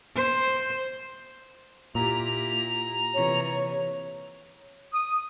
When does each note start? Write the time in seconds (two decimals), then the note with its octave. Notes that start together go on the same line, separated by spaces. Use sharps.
0.16 C5
1.95 A#2 E4 G4 A#5
3.14 C3 E3 C#5
4.93 D#6